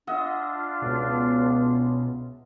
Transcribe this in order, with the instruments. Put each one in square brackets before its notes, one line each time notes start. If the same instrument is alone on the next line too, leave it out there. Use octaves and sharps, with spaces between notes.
[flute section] D4 F4 [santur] D#5 E5 F#5
[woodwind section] C#2 B3 [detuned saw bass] B2